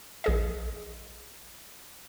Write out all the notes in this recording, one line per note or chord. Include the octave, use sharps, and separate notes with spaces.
A#1 G#4 D#5